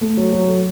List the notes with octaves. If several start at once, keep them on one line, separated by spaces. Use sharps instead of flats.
A3
F#3
F#3
A4